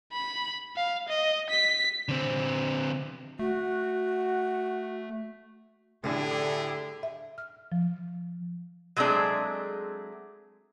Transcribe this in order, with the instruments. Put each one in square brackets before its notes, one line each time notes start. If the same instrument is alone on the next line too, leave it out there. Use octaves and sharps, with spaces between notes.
[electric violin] B5
F5
D#5
B6
[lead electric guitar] D3 C4
[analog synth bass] A3 [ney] F#4
[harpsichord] A2 [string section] D3 [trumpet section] E4 G4 G#4
[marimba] E5
F6
F3
[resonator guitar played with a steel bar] F#3 G#3 A3 C4 D4 G#4